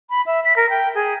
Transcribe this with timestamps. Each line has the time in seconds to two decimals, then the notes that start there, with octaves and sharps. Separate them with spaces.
0.10 B5
0.26 E5
0.45 B6
0.57 A#4
0.70 G5
0.95 G#4